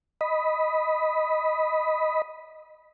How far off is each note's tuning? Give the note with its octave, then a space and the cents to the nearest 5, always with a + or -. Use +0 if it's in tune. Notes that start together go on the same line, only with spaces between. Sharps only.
D#5 +5 B5 +0